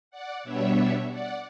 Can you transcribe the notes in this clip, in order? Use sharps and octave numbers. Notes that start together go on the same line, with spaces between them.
D5 F#5
B2 G3 B3 D4 C#5 E5
D5 F#5